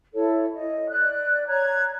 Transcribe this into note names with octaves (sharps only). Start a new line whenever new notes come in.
E4 A4 C#5
D#5
D5 F#6
C#5 A#5 F#6 G#6